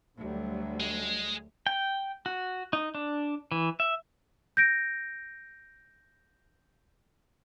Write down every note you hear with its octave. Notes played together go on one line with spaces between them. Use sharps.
D2 D3 F#3 G3
G#3
G5
F#4
D#4
D4
E3
E5
G6 A#6 D7